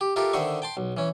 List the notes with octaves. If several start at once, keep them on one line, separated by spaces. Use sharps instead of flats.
G4
F4 G4 A4 A#4 E5
D3 D#3 C5 E5 C#6
G5 A5 C6
B1
E3 C#4